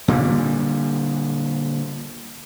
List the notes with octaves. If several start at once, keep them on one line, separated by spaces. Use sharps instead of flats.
A#2 D3 G3